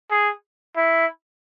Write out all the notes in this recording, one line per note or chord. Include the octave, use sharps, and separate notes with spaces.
G#4
E4